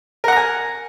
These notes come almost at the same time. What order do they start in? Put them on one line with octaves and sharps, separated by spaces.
A#4 F#5 A#5 G#5